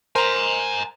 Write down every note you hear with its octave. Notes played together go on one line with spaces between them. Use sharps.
A#4 C5 G#5 A#5